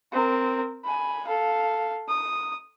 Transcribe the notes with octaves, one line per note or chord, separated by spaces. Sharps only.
C4 A#4
G#5 B5
A4 F5
D#6